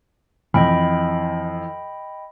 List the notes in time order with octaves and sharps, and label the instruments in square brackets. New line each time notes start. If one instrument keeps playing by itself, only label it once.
[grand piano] F2 [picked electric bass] E3 [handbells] D#5 G5 B5